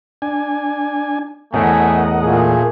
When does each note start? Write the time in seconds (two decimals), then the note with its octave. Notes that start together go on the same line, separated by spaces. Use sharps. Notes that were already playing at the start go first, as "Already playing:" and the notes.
0.22 D4 G#5
1.54 E2 A2 C3 A3 A#4 D#5 F#5 G#5
2.22 A#2 A3 G#4